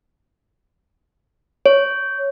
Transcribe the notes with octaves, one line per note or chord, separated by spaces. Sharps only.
C#5